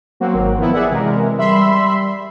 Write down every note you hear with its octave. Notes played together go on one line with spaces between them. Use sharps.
F#3 A#3 C4 F#4
G#1 F#3 A#4
D#3 F3 B3 E4
G4 G#4 D5 E5 F#5
C3 E3 G#3 A#4
G3 E5 B5 C6